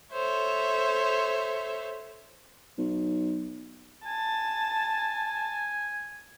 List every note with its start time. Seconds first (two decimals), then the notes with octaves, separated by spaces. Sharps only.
0.12 A4 C5 C#5 E5
2.78 B1
4.06 G#5 A5